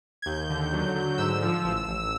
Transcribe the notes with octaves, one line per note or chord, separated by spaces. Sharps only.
G#6
D#2 G6
D3
F#3
D3
G#2 E6
F3
A1
A1